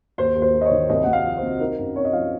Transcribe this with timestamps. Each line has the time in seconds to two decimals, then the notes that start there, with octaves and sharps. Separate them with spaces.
0.18 D#2 C5
0.36 D#2
0.42 C5
0.54 A#3
0.61 D#5
0.65 C#5
0.71 D#3
0.89 C2 D#5
1.04 C2 F#5
1.13 F5
1.25 F3
1.37 C5
1.42 C3
1.60 D#4 A#4
1.78 F#2
1.96 C4 C#5
2.05 D#5
2.13 F3 F5